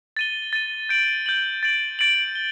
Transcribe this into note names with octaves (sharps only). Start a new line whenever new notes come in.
A6 D#7 G7
A6 D#7 G7
G6 D7 F#7
G6 D7 F#7
A6 D7 F#7
A6 D7 F#7
G7